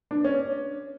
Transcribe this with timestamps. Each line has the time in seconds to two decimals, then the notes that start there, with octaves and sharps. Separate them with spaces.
0.11 D4
0.24 C#4